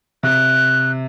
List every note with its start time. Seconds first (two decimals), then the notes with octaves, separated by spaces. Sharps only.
0.23 C3 F#6